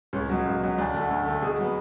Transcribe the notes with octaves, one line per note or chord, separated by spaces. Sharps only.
C#2 C#4
B2 F#3
C#2
B2 F#3
D2 D4
D3 A3
D2
D3 A3
B2 G#4
F#3 B3